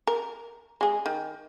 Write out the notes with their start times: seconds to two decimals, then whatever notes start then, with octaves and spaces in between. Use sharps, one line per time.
0.07 A#4
0.81 G#3 G#4
1.06 D#3